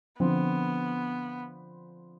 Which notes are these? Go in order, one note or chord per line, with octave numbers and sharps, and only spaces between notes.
D3 F3 B3 C4